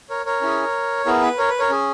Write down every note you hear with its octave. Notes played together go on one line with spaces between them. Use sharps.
A#4 C#5
A#4 C#5
C#4 E4 G#4
B3 E4 G#4 A#4
B4
A#4 C#5
B4
A#4 C#5
C#4 G#4